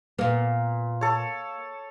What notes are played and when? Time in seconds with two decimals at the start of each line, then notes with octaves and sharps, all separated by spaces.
0.19 A#2 A#3 B3
1.01 A4 C#5